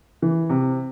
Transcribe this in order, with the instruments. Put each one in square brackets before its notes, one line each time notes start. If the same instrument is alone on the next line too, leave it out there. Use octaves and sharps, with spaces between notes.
[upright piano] E3
C3